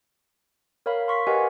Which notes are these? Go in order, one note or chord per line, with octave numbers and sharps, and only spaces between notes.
A#4 C#5 F5 B5
C6 C#6 B6
G4 A#4 B4 D#5 F#5 G#5